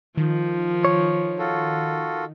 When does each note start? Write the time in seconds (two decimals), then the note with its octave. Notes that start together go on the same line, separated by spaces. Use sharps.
0.17 D#3 F3
0.85 C#5
1.39 F4 F#4 A4